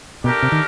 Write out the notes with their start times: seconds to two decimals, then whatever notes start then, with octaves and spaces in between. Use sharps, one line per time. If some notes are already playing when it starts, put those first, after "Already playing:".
0.24 B2 A3 D4 G4 A#4
0.42 C3
0.52 D#3